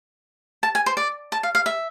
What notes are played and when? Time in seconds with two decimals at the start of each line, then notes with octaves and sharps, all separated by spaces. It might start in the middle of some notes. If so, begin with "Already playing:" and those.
0.63 A5
0.75 G#5
0.86 C5
0.97 D5
1.32 A5
1.43 F5
1.55 F5
1.66 E5